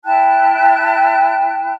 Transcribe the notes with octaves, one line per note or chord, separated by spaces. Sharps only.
E4 G5 A5 F#6